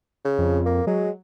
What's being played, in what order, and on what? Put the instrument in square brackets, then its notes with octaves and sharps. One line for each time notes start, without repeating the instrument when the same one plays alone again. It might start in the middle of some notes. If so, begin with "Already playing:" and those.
[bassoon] C#3
[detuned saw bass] F2
[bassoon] A#3
[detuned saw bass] F#3 [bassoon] G#3